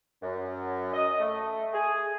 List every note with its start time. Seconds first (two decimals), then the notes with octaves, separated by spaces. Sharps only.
0.23 F#2
0.94 D#5
1.20 A3
1.74 G#4